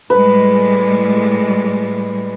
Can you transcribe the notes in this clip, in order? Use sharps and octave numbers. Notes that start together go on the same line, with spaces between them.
A2 G3 G#3 B4